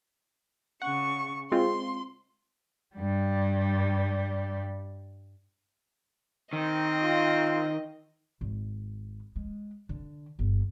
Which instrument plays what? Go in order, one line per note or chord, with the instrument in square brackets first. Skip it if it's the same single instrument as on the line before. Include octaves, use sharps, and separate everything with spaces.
[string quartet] C#3 C#6 [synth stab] F#5
[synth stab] G#3 C4 F4 [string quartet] C6
[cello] G2 G3
[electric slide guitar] D#3 [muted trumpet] C4 [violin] D#5
[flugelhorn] F4
[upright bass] G#1
G#3
D3
G1